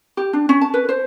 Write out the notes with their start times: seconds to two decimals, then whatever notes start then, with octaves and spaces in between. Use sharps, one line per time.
0.17 G4
0.33 D4
0.49 C#4
0.61 A5
0.74 B4
0.89 C5